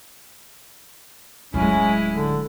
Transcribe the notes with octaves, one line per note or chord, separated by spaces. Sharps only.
D1 F#3 G#3 C#4 E4
D3